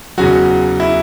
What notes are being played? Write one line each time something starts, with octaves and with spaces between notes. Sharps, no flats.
E2 C#3 F#3 F#4
E4